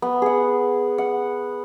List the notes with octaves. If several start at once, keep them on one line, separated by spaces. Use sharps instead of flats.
B3
G#4 F#5
F#5